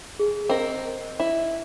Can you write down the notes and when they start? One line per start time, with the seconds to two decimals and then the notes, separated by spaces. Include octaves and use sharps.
0.20 G#4
0.49 C4 A#4 D#5
1.20 E4